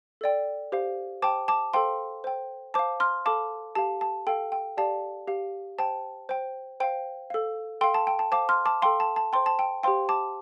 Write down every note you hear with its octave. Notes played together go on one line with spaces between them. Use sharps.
A4 D5 G5
G4 C5 F5
C5 G5 A5 D6
A5 D6
A4 C5 F5 G5 C6
C5 G5
C5 F5 A5 D6
C6 F6
A4 F5 A5 D6
G4 F5 A5
A5
A4 F5 G5
G5
G4 D5 F5 A5
G4 F5
C5 G5 A5
C5 G5
C5 F5 G5
A4 F5
A4 F5 G5 C6
A5
G5
A5
C5 F5 A5 D6
C6 F6
A5 D6
A4 F5 G5 C6
A5
A5
C5 G5 C6
A5
G5
G4 C5 F5 G5 C6
A5 D6